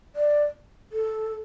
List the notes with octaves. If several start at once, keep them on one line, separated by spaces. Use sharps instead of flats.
D5
A4